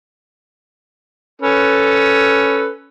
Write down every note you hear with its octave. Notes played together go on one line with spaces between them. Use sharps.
C#4 A4 B4